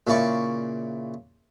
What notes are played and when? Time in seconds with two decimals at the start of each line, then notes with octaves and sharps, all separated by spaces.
0.07 A#2 C#3 E4 D5 C#6